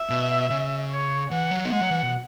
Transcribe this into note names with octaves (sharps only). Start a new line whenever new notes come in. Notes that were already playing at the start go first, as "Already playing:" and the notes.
Already playing: E5
B2
C#3
C#5
E3 F#5
F#3
B3
G#3 F#5
F#3
E3
B2